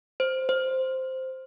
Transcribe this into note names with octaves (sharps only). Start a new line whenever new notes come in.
C5
C5